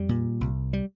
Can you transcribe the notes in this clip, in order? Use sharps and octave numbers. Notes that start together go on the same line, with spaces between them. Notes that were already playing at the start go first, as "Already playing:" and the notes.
Already playing: F2 G3
A#2
C2
G3